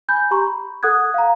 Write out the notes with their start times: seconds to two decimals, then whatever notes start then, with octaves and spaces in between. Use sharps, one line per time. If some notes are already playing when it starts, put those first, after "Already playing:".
0.09 G#5 B5 G6
0.31 G4 A#5 C6 C#6
0.47 B5
0.83 A4 F#5 D#6 F#6 G#6
1.14 F5 A#5